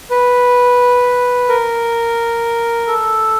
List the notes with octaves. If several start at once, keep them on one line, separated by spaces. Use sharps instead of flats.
B4
A#4
A4